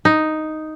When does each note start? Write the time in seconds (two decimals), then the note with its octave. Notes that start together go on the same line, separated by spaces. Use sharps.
0.05 D#4